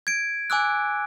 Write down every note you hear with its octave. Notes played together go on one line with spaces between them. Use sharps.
G#6 D7
G#5 D6 E6 F#6